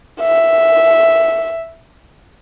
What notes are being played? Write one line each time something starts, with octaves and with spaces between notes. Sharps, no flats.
E5